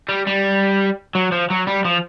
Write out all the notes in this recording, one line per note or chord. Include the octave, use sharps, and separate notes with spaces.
G3
G3
F#3
F3
F#3
G3
F3